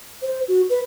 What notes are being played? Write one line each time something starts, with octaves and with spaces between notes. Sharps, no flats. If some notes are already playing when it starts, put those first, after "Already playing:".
C5
F#4
B4